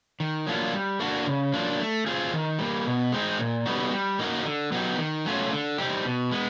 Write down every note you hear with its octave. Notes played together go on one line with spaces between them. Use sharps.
D#3
F#3 A#3 D4 F4
G3
A#3 D4 F#4
C#3
F#3 A#3 D4 F4
A3
C4 F4 G#4
D#3
G3 A#3
B2
G#3 C4 D#4 G#4
A#2
G3 B3 D#4 F#4
G3
A#3 D#4 F#4 A#4
D3
F#3 B3 D#4 G4
D#3
F#3 A3 C#4 F4
D3
G3 C4 D#4 G4
B2
G#3 B3